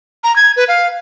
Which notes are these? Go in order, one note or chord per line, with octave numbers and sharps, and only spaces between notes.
A#5
G#6
B4
F5